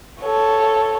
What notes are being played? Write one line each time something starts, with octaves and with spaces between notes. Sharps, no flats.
A4 C#5